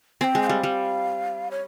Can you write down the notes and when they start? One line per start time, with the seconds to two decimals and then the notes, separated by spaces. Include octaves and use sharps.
0.21 C4 G#5
0.24 G5
0.35 G#3
0.42 G5
0.47 G3 F5
0.63 G3
1.51 C#5